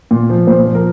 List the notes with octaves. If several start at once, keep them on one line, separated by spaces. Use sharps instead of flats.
A#2
F3
A#2 C5
F3
A#4